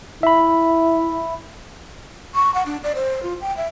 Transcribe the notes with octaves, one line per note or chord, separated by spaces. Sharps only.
E4 E5 B5
C#6
F#5
D4
D5
C5
F4
G5
E5